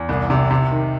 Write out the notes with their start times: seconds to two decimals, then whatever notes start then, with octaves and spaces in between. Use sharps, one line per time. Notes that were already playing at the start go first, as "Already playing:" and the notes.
Already playing: E2
0.09 C2
0.30 C3
0.51 C3
0.71 D#3